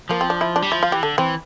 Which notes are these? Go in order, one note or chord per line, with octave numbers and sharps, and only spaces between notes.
F3 A#3
C4
D4
E4
D4
G3
F3 E4
F4
E3 G4
D3 A4
E3 C4